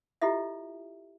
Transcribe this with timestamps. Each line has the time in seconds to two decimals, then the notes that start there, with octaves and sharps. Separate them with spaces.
0.22 E4 F4 G4 A4 D#5 E5